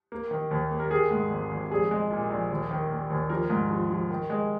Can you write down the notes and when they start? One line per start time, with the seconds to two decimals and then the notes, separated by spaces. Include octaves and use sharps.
0.12 A#3
0.31 D#3
0.51 D#2
0.71 A#3
0.80 A#4
0.91 D#3 G#4
1.11 G#2
1.30 G#1
1.51 G#1
1.71 A#1 G#4
1.91 G#3
2.11 A#2
2.30 A#1
2.51 D#2
2.71 D#3
2.90 A#3
3.10 D#2
3.30 F3 A#4
3.50 G#2
3.71 F3
3.90 F3
4.10 D#3
4.30 G#3